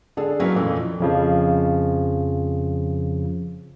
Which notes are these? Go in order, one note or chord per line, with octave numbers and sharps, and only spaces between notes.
D3 D4 G#4 A4
F#3 A#3 C#4 E4 A#4 B4
F2 A#2 E3 A3
F2 C#3 F3